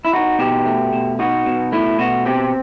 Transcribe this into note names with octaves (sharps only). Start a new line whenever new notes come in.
E4
D#4 F#4
B2 G4
A3
B2
D#4 F#4
B2
A3 E4
B2 F#4
C4 G4